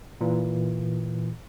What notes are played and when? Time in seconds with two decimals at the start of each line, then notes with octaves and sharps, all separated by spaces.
0.21 A#2 E3